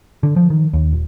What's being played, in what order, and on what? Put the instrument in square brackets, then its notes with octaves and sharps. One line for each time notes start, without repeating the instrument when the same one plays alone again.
[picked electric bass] D3
F3
D#3
D#2
D#1